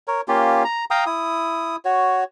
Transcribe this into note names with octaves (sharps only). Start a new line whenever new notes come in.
A#4 C#5
A#3 C#4 F4 G4
A#5
F5 G5 A#5 D#6
E4 D#6
F#4 C#5